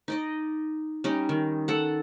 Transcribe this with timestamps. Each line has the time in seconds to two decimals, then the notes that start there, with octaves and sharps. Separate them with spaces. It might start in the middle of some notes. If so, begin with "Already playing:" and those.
0.08 D#4 D5 D#5
1.04 G3 C#4 D#4
1.29 D#3
1.68 A4 F#5